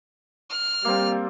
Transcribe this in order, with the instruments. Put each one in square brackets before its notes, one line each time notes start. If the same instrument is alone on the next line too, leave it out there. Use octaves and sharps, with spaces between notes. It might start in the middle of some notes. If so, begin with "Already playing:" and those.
[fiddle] F6
[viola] G3 [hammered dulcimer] A#3 C4